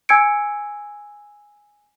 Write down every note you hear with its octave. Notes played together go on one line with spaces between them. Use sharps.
G#5 E6 G#6 C#7 D7